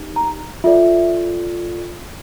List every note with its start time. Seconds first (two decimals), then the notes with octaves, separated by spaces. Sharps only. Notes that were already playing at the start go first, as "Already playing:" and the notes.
Already playing: D#4 G4
0.16 A#5
0.64 F4 A4 D5 E5